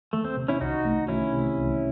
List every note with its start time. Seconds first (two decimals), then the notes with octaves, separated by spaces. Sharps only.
0.13 D#3 A3
0.24 C4
0.37 C3
0.48 C#4 E4
0.61 C2 D#4 F#4
0.85 A3
1.08 D#3 C#4 E4
1.33 C3
1.57 C2